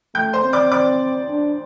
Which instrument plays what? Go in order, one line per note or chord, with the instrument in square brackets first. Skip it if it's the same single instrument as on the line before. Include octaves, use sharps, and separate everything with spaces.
[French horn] A3 [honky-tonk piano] G5 G6
[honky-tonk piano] C5 C6
[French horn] C4
[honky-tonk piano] D5 D6
D5 D6
[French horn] D4